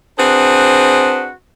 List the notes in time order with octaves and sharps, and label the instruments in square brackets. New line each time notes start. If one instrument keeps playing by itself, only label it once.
[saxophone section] C4 D4 F#4 G#4 B4 C5